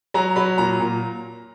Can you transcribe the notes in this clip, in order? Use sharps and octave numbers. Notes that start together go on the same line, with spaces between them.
F#3 A#5
F#3 B5
A#2 A#5
A#2